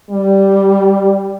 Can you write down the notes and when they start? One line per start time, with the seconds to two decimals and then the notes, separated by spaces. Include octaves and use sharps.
0.11 G3